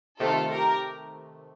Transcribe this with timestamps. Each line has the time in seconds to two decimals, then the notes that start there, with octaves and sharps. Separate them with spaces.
0.20 C3 D#3 A3 F4 A4
0.50 G4 A#4